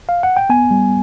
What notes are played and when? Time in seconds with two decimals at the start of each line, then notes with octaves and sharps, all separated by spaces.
0.09 F5
0.23 F#5
0.37 G5
0.50 B3 G#5
0.71 G3